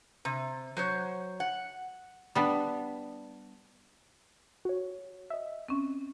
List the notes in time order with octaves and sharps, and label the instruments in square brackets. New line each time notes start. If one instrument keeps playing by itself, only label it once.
[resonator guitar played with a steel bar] C3
F#3 C5 C#5
F#5
[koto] G3 B3 D4
[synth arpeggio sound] F#4 C#5
D#5 E5
[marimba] C4 C#4